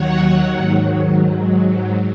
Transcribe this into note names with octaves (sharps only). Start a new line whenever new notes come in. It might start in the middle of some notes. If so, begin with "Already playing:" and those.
Already playing: D#2 D#3 F#3 C#5 F#5
G#2 D#3 F#3
G#2 F#3